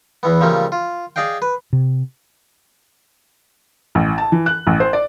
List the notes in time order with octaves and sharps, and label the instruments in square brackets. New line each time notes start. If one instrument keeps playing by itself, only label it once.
[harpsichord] E2 E3 B3
C#3 F3 G3 A3 A#3
F4
G#4 D5 D#5 F5 G5
B4
[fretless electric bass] C3
[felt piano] A1
A5
E3
F#6
A1
C5
D5